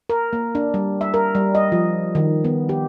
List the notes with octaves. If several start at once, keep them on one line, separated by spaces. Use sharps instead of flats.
A#4
A#3
D4
G3
E5
A#4
G3
D#5
F3
D#3
B3
G4